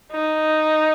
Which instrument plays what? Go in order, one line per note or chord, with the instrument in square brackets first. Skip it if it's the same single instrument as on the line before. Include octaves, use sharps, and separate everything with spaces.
[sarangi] D#4